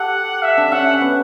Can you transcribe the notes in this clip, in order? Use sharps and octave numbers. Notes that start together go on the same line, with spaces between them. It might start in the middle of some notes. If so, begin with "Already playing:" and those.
Already playing: G4 A4 F#5
E5
D4
C#4 F#5
C#4
B3